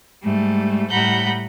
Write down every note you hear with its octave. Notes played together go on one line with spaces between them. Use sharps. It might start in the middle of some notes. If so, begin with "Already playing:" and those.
G#2 G3 A3
A2 G3 F#5 A#5 B5 G6